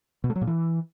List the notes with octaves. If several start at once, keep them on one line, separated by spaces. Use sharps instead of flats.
B2
A3
F#3
A#2
E3